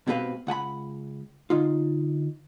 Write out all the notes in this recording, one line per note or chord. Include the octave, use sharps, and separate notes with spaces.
G#2 B2 C4 G4 B4 F5
C#2 F#5 G#5 B5
D3 D#4 F4